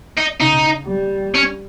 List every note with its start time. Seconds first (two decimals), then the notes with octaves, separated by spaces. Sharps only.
0.17 D#4
0.40 C#3 D#4
0.87 G3
1.35 C#4